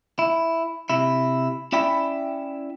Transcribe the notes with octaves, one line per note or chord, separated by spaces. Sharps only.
E4
C3 E4
C#4 E4 D5 E5 G5 B5